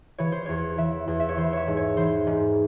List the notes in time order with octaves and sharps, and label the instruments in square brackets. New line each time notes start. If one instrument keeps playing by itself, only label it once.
[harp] E3 C#5
C5
E2 C#5
E3 E5
E2
E5
C#5
E3 C5
C#5 E5
G#2
C#5
E3 C5
G#2